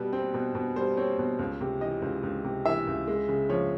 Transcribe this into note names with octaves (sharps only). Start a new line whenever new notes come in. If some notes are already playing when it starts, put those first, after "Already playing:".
Already playing: B2 G3 B4
C4
B2
B2
G3 C5
C4 C#5
B2
C#2
C3
E3 D#5
C#2
C#2
C3
E3 E5
C#2
G#3
C#3
F3 C#5